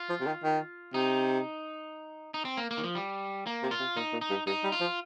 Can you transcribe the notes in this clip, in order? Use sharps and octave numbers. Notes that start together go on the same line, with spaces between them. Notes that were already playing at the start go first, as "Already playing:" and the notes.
Already playing: F4
F3
C3
D#3
D#3
C3 D#4
D#4
C4
A#3
A#3
D#3
F3
G3
A#3
C3
F4
C3
A#2 D#4
A#2
D#4
G2
G2 D#4
G3
F4
F3